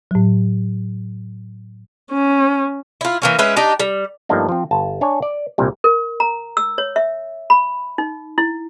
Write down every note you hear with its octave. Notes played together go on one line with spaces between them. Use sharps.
A2 F#3
C#4
E4 F4
E3 A#3 C#4
G#3 C#4 B4 E5
D4 D#4 G4
G3
G2 F3 A3 A#3 D4 D#4
F3 C4
G1 A5
D4 C#5 G#5
D5
C2 A#2 G3
A#4
A#5
E6
C#5
E5
B5
D#4
E4